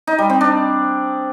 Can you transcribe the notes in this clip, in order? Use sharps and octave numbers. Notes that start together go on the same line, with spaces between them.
D#4
G3
C4
D4